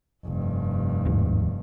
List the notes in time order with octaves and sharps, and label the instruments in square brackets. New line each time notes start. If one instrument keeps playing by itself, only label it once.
[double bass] F1 G2
[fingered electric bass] D#2 G#2 F3